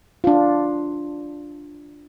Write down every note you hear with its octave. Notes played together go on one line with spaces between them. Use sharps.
D4 F4